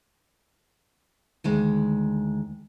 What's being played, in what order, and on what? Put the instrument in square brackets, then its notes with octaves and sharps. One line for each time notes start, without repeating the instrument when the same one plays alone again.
[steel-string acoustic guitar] D2 D#3 G#3